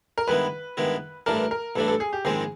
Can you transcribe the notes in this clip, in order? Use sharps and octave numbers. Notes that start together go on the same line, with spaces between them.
A#4
G2 D#3 G#3 B3 E4 B4
G2 D#3 G#3 B3 E4
A1 G2 E3 A3 D4 A#4
A#4
A1 G2 E3 A3 D4 A4
A4
G#4
G4
A#1 G#2 D#3 G#3 C4 G#4